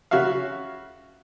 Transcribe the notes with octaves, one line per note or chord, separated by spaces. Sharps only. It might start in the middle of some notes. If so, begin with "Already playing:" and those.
C#3 C#4 F#4 E5 F5